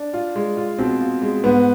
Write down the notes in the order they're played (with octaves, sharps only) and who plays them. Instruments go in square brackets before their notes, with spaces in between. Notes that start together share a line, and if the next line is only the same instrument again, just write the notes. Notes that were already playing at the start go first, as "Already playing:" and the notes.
Already playing: [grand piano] D4
[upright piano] F4
G#3
F4
[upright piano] B2 [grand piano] C4
[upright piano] F4
G#3
[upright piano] G#2 [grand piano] B3